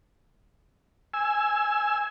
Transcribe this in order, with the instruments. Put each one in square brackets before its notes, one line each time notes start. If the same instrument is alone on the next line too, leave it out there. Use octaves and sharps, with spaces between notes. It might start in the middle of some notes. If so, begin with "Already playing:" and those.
[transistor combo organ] G#5 E6